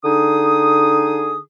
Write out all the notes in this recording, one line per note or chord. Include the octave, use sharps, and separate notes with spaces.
D3 D#4 G#4 D#6